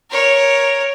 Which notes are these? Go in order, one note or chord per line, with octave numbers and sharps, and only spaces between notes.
A#4 C#5